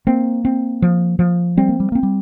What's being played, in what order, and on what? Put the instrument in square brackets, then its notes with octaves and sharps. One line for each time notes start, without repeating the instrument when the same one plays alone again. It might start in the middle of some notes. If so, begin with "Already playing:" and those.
[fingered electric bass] A#3 [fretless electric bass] C4
[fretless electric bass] C4
F3
F3
[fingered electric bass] G3 [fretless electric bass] C4
[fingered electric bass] A#3
G3
[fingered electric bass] A#3 [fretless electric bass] C4
[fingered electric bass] G3